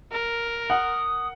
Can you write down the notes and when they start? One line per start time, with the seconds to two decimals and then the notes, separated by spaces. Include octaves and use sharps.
0.12 A#4
0.70 F#5 D#6